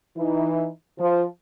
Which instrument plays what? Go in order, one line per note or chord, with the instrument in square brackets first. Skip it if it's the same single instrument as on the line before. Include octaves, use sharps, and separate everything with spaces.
[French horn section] E3 D#4 E4
F3